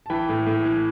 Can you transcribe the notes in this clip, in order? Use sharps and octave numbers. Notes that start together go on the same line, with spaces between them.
A5
E3 G5 B5
A2
A2
E3